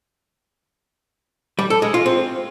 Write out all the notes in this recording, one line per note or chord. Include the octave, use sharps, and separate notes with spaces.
G3
A4
G#3
F4
C4